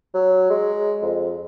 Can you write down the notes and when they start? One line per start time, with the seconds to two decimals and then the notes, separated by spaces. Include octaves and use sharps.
0.14 F#3
0.50 G#3
1.02 F2